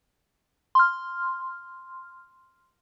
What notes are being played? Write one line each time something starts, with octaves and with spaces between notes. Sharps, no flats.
C6 F6